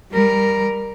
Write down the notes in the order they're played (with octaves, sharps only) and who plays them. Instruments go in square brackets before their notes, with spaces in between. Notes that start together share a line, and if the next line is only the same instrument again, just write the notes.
[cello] G3 A#4